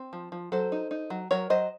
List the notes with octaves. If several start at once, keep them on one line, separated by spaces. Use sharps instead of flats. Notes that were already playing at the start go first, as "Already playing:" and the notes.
Already playing: C4
F3
F3
F#3 A4 C5
D#4
D#4
F#3
F#3 A#4 C#5
F#3 C5 D#5